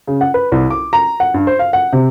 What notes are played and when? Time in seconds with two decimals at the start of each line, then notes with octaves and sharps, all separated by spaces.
0.07 C#3
0.21 F#5
0.34 B4
0.52 C2
0.70 D6
0.93 A#5
1.20 F#5
1.34 G2
1.47 C5
1.59 F5
1.73 F#5
1.93 C3